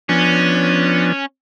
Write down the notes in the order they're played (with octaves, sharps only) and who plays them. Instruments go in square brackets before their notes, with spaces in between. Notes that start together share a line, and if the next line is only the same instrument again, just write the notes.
[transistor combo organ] F3 B3 D4 [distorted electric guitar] C#4